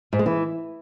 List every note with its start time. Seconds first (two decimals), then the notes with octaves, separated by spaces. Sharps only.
0.13 G#2
0.19 G#3
0.26 E3